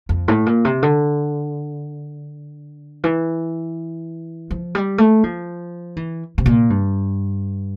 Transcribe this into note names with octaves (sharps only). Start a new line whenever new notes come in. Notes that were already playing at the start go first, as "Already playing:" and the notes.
F2
A2
A#2
C3
D3
E3
F3
G3
A3
F3
E3
C3
A#2
G2